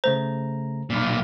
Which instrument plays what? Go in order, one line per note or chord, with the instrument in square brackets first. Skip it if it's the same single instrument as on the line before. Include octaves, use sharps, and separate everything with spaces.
[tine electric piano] C#3 A3 A#5 [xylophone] C5
[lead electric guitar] B1 A#2